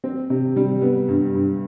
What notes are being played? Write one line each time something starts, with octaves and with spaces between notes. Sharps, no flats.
C4
C3
G3
B3
G2
G2